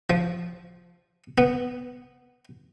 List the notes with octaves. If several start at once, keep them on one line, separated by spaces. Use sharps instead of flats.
F3
B3